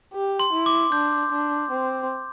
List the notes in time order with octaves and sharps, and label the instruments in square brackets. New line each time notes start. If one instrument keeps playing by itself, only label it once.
[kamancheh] G4
[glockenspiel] C6
[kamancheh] E4
[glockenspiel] D6
[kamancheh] D4 [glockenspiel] G6
[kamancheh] D4
C4